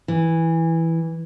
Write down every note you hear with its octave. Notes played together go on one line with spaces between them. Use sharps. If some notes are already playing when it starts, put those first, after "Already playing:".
E3